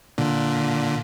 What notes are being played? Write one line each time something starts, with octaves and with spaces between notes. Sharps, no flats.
A#2 D3